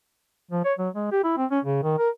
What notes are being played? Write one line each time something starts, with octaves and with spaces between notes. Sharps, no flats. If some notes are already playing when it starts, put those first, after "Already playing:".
F3
C#5
F#3
G#3
G4
E4
C4
C#4
C#3
D#3
A#4